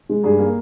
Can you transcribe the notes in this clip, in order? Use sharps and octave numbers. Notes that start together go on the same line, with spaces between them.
G#3
G2 G#4
A#3